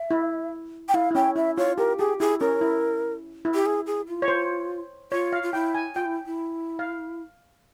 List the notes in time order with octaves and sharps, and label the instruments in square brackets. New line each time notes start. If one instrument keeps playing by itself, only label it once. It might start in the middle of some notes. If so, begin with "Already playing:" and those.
Already playing: [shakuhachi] E5
[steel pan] E4
[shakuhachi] G5
[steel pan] E4 [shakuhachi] F5
[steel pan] E4
[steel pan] C#4 [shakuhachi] G5
[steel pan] E4 [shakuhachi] E5
[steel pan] F4 [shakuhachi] C#5
[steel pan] G4 [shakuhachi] A#4
[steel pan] G4 [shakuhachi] G#4
[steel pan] E4 [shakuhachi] G#4
[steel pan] C#4 [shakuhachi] A#4
[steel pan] E4
E4
[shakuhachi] G4
G#4
G#4
F4
[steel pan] C#5
C5
[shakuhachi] F4 [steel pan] C#5
[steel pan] F5
[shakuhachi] F4
[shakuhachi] E4 [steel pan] G5
[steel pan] G#5
[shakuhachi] F4 [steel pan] G5
[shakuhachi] E4
E4
[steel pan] F5